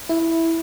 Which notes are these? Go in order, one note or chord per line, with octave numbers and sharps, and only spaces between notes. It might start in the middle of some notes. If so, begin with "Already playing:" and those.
E4